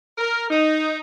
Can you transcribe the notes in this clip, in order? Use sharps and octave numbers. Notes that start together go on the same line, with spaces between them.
A#4
D#4